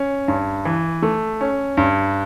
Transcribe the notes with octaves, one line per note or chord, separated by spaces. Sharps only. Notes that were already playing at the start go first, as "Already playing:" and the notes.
Already playing: C#4
G2
E3
A3
C#4
G2